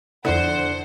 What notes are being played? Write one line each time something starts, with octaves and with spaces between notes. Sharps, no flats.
F2 D3 E4 C5 F#5